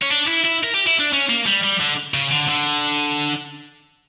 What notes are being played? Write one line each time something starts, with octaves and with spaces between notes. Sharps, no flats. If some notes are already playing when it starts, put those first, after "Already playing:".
C#4
D4
E4
E4
A#4
G4
E4
D4
C#4
A#3
G3
G3
D3
C#3
D3
D3